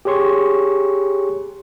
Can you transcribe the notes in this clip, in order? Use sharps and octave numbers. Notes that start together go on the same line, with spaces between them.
G4 G#4 C#5 C6 C#6